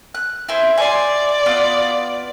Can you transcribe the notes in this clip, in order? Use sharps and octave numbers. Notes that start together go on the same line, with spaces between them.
F#6
E4 G#4 C5
D5 G#5 C6
B3 F4 D#6